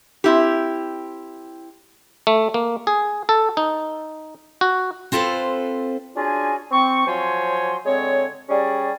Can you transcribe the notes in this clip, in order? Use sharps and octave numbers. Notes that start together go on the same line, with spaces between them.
C4 E4 G4
A3
A#3
G#4
A4
D#4
F#4
C4 F4 A4 B4 C5
C#4 D4 F4 F#4 G#4 G#5
C4 C#6
F3 F#3 C5 C#5 G#5 C6
D3 G#3 C4 C#5
G3 C#4 G4 G#4 D5